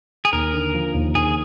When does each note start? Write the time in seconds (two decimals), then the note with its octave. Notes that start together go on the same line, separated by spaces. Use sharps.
0.25 G#4
0.32 D#2 A#4
0.53 D3
0.74 F3
0.94 D#2
1.15 D#2 G#4